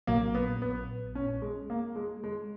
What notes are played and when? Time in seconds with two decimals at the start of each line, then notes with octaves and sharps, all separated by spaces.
0.07 A#1 A#2 F#3 A#3
0.34 B3
0.62 B3
1.15 C#4
1.42 G#3
1.70 A#3
1.96 G#3
2.24 G#3